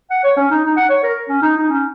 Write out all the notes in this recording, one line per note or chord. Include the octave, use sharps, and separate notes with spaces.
F#5
C#5
C#4
D#4
D#4
F#5
C#5
A#4
C#4
D#4
D#4
C#4